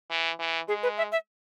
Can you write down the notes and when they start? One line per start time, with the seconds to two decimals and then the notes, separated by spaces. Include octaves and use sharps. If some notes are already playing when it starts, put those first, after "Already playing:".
0.11 E3
0.40 E3
0.68 G#3 G#4
0.83 B4
0.98 E5
1.12 E5